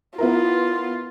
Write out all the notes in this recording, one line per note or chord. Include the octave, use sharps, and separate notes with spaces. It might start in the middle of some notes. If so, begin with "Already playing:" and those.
B3 E4 F4 A#4